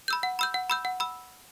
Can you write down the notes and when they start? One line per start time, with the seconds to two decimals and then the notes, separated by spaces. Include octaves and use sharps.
0.08 B5 E6 G6
0.23 F#5
0.39 B5 E6 G6
0.54 F#5
0.70 B5 E6 G6
0.85 F#5
1.00 B5 E6